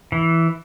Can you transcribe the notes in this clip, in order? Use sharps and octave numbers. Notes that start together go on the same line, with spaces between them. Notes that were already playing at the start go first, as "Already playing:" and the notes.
E3